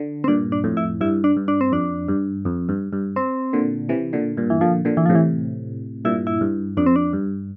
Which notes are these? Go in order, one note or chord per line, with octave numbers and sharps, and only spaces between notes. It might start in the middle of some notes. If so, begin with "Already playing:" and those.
Already playing: D3
C4
G2 A#2 D4
D4
F2 A2
E4
G2 E4
D4
G2
D4
C4
F2 D4
G2
F2
G2
G2
C4
A#2 D3
C3 E3
A#2 D3
G2 A#2
E3
A#2 D3 F3
A#2 D3
E3
A2 C3 F3
E3
G2 A#2 E4
E4
G2
F2 D4
C4
D4
G2